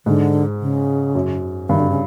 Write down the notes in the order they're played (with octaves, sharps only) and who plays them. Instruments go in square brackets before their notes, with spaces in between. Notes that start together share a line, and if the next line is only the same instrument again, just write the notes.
[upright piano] G#2 [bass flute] D3
[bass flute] C#3
[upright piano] F#2
[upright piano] G2 [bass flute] D#3
[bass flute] D3
C#3